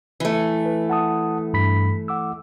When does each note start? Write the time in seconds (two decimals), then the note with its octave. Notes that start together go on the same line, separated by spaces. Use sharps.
0.20 E3 A3
0.66 B4
0.90 F#5 A5 D#6
1.54 G2 B5 B6
2.08 F#5 D6 E6